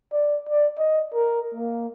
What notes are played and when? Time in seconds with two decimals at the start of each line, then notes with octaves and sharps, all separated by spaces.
0.12 D5
0.49 D5
0.79 D#5
1.14 A#4
1.54 A#3